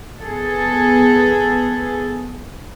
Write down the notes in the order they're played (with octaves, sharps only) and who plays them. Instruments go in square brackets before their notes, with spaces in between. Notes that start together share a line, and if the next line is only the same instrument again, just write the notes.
[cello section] B3 G#4 A4